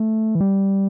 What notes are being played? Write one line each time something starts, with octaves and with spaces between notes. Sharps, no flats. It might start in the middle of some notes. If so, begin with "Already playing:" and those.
Already playing: A3
E3
G3